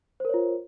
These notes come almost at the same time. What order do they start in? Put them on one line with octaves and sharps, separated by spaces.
C5 A#4 C#5 F4